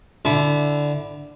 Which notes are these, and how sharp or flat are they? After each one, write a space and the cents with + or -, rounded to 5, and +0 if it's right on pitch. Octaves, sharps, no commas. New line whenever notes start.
D3 +0 E4 +0 A5 -35